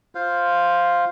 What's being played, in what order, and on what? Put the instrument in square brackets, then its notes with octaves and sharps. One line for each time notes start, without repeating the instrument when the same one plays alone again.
[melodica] F4 C5 F5